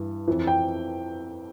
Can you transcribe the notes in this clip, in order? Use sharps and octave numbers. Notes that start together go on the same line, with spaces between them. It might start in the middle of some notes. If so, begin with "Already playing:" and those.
Already playing: G2 E3
F2 E3
G5